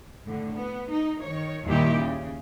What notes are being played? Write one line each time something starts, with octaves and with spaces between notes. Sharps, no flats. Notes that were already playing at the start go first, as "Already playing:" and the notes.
A2 D3
B3
D#4
D#3 C#5
D#2 A#2 D#3 G3 E4 G4
C#3